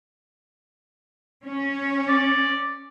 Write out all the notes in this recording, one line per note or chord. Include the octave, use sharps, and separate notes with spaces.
C#4
D5